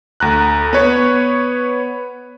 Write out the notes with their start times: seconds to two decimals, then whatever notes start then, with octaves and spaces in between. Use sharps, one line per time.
0.20 D2 A#5 F#6
0.73 B3 B4 C#5